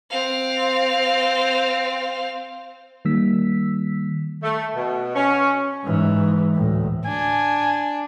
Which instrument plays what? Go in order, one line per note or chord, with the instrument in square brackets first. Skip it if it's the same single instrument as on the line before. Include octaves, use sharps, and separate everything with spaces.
[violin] C4 F5
[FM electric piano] D#3 G3 A#3 E6 B6
[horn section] A3
B2
C#4
[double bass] G#2 E3
D2 A2
[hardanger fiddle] D4 [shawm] G#5